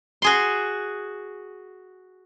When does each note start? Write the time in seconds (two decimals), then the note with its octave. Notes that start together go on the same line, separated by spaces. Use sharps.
0.22 F#4 G#4 C6